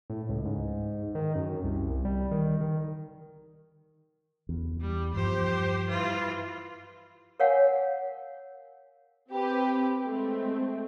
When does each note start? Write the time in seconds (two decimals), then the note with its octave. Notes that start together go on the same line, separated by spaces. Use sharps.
0.10 A2
0.29 C#2
0.45 G#2
0.68 G#2
1.15 D#3
1.35 F#2
1.64 C2
2.05 G3
2.31 D#3
2.61 D#3
4.49 E2
4.80 G3
5.14 G2 F3 G4 C5
5.89 E3 F4
7.40 A#4 C#5 F5 F#5 G#5
9.30 C4 G4 B4
10.03 G#3 A3 C4